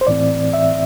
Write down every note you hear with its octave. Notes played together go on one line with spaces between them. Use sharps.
C5
A2 E3 C4 D5
E5